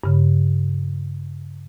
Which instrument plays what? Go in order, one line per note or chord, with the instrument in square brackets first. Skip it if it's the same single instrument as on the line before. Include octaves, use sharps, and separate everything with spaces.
[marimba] G2 C#3